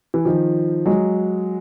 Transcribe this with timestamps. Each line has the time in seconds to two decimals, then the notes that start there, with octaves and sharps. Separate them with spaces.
0.14 E3
0.25 D#3 F3
0.86 F#3 G#3